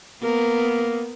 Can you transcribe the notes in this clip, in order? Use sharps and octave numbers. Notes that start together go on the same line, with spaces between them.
A#3 B3 A#4